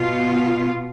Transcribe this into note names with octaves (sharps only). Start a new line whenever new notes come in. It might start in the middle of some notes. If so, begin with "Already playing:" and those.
Already playing: B2 B3 F4